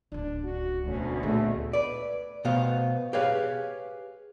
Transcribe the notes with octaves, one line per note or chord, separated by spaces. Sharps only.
D1 C#2 D4
F#4
D2 B2 C#4
A#2 G#3 A3
B4 D5
B2 A3 B3 C5 F5
G4 G#4 B4 C#5 F5